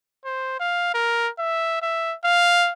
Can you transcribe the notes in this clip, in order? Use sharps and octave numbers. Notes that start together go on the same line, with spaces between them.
C5
F5
A#4
E5
E5
F5